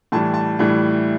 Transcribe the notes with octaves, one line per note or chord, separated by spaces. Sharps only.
A2 E3 G3 A5
A5
A2 E3 G3